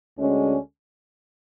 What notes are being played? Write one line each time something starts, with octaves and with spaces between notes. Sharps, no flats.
D2 D3 G#3 C#4